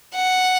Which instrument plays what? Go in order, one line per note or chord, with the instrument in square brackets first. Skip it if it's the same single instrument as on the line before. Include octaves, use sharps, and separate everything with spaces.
[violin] F#5